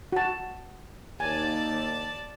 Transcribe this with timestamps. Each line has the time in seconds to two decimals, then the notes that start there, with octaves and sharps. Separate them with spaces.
0.12 F#4 A5
1.20 D#2 D5 G#5 A5